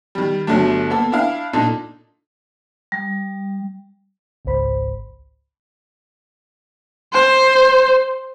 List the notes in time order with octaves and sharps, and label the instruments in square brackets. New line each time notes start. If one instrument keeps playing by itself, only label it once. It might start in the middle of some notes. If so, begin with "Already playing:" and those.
[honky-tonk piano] D#3 G3
G1 F#3 A3 D4
A#3 B3 A4
D4 E4 F5
A#2 D4 D#4 A4
[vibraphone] G3
[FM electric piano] G#1 C#2 G#2 C5 B5
[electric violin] C5